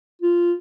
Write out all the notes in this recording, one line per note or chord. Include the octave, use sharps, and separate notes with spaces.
F4